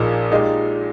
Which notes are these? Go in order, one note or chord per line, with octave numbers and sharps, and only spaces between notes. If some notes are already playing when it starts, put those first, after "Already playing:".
Already playing: A#1 A#2 A#3 D#4 G#4
A#2 G#3 D#4 G4